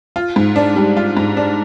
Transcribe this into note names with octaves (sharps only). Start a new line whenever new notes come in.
F4
G#2
D4
G3
F4
G#2
D4